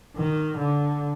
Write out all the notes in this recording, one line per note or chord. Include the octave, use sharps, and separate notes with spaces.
D#3
D3